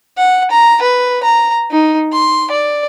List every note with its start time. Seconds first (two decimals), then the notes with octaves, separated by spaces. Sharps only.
0.18 F#5
0.51 A#5
0.82 B4
1.23 A#5
1.71 D#4
2.13 C6
2.52 D5